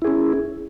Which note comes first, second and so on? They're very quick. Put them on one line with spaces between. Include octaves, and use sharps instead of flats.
E4 G#4 C#4